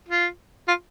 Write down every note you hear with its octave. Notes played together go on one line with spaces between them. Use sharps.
F4
F4